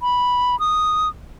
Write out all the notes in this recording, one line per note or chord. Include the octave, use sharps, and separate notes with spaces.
B5
D#6